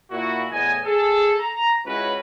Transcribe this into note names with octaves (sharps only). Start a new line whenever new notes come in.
A#2 E4 F#4
E2 A2 B3 D#5 G#5
G#4 A4
A#5
C#2 C#4 E4 F#4 B4